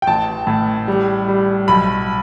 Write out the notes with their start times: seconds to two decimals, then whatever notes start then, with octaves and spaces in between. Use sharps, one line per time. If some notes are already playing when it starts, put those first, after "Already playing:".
0.02 G5
0.07 A1 A5
0.47 A2
0.88 G3
1.28 G3
1.68 B1 B5